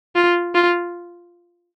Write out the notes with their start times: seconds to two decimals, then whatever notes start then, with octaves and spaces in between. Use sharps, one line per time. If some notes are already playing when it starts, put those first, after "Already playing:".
0.16 F4
0.55 F4